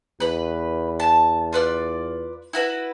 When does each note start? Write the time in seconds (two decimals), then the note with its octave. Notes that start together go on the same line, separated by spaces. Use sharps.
0.20 E2 B4 B5
1.00 A5
1.53 F4 B4 D5
2.53 E4 F#4 B4